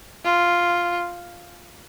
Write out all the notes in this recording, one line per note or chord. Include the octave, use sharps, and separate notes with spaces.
F4